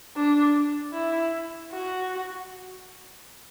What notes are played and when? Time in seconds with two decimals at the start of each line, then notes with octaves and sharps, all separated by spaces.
0.16 D4
0.93 E4
1.71 F#4